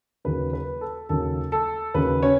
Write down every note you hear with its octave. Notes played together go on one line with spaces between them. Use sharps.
D#2 C#3 F#3 B4
B4
A4
D#2 C#3 F#3 A4
A4
D#2 C#3 F#3 B4
C#4 C#5